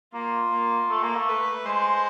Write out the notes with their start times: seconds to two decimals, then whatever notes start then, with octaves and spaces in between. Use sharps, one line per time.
0.14 A#3 F4
0.52 A#3
0.90 A3 A4
1.03 A#3
1.16 A3
1.28 B4
1.65 G#3 C5